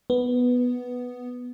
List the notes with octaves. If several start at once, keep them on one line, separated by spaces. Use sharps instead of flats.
B3